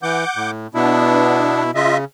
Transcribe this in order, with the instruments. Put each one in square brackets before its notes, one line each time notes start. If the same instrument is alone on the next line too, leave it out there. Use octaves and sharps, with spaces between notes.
[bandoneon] E3 [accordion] F#5 D6 G6
[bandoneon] A2
[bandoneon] B2 E4 [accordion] B3 D4
[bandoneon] C#3 [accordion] F4 D#5 E5